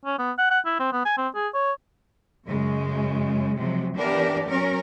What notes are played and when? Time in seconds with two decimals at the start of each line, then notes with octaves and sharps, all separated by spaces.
0.05 C#4
0.19 B3
0.39 F#5
0.50 F#5
0.65 E4
0.79 C4
0.92 B3
1.05 G#5
1.17 C4
1.35 G#4
1.54 C#5
2.46 F#2 C#3 G#3
3.57 C3 F3 F#3 G#3
3.96 E3 B3 D4 G4 A#4 D5
4.48 F#3 C#4 A#4